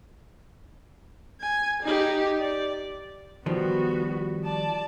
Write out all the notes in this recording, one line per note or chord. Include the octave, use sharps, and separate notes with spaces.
G#5
D#4 G4
D5
D#3 F3 G3 B3 F#4
D5 A5